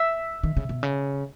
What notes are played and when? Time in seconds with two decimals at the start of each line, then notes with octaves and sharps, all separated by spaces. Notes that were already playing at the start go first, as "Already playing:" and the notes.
Already playing: E5
0.43 D#3
0.57 C#3
0.69 B2
0.83 C#3